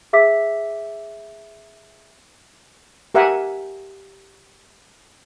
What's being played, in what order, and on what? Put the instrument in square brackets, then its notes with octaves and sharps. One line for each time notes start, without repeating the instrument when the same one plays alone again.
[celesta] G#4 E5 D6 E6 B6
[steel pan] G4 A#4 E5 F#5 G#5